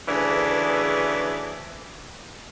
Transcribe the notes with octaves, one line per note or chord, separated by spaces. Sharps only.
D2 C#3 E3 B3 D4 G#4